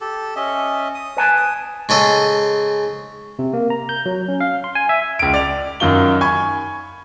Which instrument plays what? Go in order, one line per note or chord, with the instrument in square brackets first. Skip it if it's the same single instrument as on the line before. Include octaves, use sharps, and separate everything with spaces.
[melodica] G4 A4
C#4 D#5 E5
D#6
[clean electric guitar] B4 G#5 A5
[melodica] D#6
[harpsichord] G#2 C#3 A4 D#5
[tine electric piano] C3
A#3
A#5
G6
F#3
C#4
F5
C6
G#5
E5
[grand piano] C#2 D7
D5 F7
F#2 D#3 F4 G7
G#5 B5 C#6 G#6